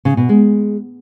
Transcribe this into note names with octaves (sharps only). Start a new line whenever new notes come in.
C#3
B2
G#3